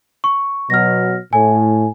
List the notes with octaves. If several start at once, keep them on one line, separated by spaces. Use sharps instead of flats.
C#6
B2 F#3 F6 A#6
A2 G#5